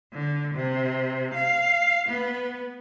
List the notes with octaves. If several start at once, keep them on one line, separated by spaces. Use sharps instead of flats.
D3
C3
F5
B3